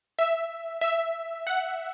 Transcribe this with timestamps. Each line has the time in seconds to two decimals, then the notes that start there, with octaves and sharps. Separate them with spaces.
0.19 E5
0.81 E5
1.47 F#5